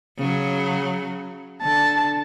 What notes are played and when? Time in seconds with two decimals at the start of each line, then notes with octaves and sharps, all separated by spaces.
0.18 C#3 F#3
1.62 D3 A5